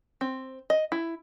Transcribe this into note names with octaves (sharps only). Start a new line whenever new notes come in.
C4
D#5
E4